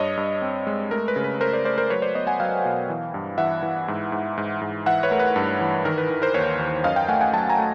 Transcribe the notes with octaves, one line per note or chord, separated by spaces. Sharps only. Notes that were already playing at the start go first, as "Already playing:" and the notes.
Already playing: G2 C#5 D#5
G2
C4
G#3
A3 A#4
B4
C#3
B4
A3 A#4 C5
C5 D5
A3 C5 D5
A#4 C5
F#3 B4 C#5
C5 D5
B3 C#5 D#5
F#5 G#5
F#3 F5 G5
B2
E3
G2
E3 E5 F#5
E3
G#2
G#2
G#2
G#2
E3 E5 F#5
B4 C#5
A3 A#4
B4
G2
E3
D#3 A#4
B4
D#3
A#4 C5
D#2 B4 C#5
D#2
F#2 D#5 F5
F5 G5
A3 F#5 G#5
F#5 G#5
F#3 G5 A5
G#5 A#5
A3